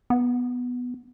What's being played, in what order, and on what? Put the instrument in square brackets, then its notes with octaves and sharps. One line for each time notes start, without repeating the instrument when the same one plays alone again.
[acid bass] B3